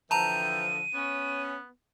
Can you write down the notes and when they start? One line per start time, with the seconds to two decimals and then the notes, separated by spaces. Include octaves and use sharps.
0.11 D3 E3 F3 G5 A5 A#5 D#7
0.94 B3 C#4